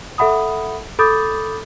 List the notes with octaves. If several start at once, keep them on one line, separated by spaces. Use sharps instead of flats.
A4 E5 F#5 B5 D#6
A4 B5 D6 D#6 G6 A6